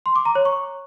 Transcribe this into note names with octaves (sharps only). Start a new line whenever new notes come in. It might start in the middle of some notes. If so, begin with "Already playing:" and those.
C6
D6
A#5
C#5
C#6